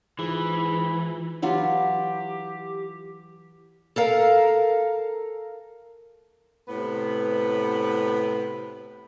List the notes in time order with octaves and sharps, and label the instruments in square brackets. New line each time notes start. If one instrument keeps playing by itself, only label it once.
[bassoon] G#2 [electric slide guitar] E3 [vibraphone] E4 F4 [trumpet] B5
[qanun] E3 F#3 F4 [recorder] G4
[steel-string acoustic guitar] A4 A#4 F5
[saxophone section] A2 C3 B3 B4